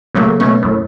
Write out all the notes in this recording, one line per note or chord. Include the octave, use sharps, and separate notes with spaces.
A#2 C#3 F#3 A3 A#3
B2 A3 C#4
F#2 A2